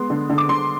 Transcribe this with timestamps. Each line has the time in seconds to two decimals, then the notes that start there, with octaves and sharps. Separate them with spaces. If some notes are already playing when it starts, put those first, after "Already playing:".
Already playing: G#3 B3 C6
0.10 D3
0.29 D3
0.38 D6
0.49 D3 C6